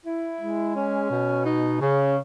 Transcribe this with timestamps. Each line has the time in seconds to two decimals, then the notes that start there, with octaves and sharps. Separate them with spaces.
0.06 E4
0.41 G#3
0.76 C#4
1.10 B2
1.45 D#4
1.80 C#3